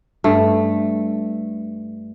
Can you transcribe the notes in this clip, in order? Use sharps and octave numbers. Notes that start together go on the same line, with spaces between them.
G2 A3